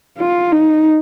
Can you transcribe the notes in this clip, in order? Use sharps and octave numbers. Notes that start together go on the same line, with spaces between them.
F4
D#4